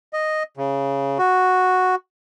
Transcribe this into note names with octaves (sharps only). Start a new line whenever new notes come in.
D#5
C#3
F#4